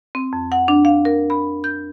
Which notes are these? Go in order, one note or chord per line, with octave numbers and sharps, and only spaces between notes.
C4
F2
F#5
D4
F5
A#4
B5
G6